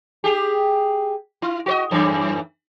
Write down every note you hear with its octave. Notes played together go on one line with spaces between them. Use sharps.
G4 G#4
E4
F#4 B4 D#5
F#2 A2 E3